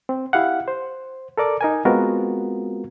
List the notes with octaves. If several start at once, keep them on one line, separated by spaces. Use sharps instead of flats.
C4
E4 G4 F5 F#5
C5
A4 A#4 D5 D6
D#4 A#4 G#5
G#3 B3 C4 F4 F#4 A#4